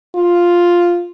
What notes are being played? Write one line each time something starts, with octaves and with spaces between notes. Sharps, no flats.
F4